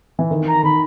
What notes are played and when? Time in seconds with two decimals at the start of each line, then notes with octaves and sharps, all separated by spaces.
0.19 E3
0.31 D#3
0.48 A#5
0.63 D#3 B5